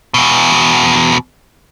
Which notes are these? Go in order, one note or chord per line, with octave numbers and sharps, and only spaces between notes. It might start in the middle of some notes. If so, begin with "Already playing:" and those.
E2 B2